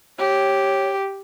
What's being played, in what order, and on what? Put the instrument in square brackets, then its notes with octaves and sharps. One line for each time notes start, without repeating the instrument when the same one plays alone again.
[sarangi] G4 [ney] C#5